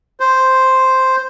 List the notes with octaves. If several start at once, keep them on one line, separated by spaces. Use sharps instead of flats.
C5